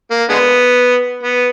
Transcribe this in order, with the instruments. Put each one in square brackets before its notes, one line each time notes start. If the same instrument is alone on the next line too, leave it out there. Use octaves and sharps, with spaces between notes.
[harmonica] A#3
D3 G#3 B3
B3